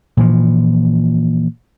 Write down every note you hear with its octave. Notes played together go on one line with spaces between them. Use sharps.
A#2 E3 F3